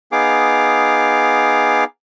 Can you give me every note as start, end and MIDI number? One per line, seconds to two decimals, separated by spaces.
0.12 1.84 59
0.12 1.84 63
0.12 1.84 68
0.12 1.84 77
0.12 1.84 86